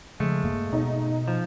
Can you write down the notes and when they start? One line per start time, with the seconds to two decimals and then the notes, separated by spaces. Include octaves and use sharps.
0.20 C#3 F3 G#3 A3
0.44 D#1 G2 A#3
0.73 B2 B3 D#4
1.28 F3